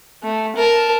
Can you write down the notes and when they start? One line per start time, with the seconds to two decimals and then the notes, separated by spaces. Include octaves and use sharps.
0.23 A3
0.56 A#4 A5